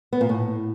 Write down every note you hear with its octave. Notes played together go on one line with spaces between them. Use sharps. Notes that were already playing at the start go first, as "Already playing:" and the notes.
B3
A#2
A2